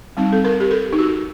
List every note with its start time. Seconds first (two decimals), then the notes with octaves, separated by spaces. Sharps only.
0.17 G3 C4 D#4
0.33 A4
0.45 A#4
0.60 G4
0.71 A4
0.93 D#4
0.99 F#4